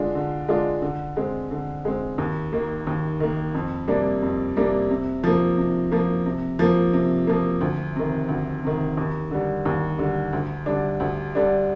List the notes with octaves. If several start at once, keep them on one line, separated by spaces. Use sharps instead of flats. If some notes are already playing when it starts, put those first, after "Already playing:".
Already playing: D3 G#3 D4 F4
D3
G#3 D4 F4
D3
G#3 C4
D3
G#3 C4
D#2
D#3 A#3
D#2
D#3 A#3
F2
C3 G3 A#3 D4
F2
C3 G3 A#3 D4
C3
F3 A#3
C3
F3 A#3
C3
F3 A#3
C3
F3 A#3
D2
C3 D#3
D2
C3 D#3
D#2
D3 G3
D#2
D3 G3
D2
D3 G3 D4
D2
D3 G3 D4